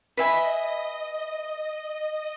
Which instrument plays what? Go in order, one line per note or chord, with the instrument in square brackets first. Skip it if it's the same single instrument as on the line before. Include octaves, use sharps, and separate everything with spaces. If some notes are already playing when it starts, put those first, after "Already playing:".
[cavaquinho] B4 E5 G#5 B5 [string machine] D#5